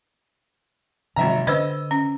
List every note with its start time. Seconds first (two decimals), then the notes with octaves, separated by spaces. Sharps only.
1.16 G#1 C3 F3 F#3 E5 A#5
1.47 D3 D4 B4 C5 D#5 E6
1.91 C#4